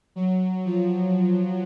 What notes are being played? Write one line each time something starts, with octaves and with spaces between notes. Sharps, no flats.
F#3
F3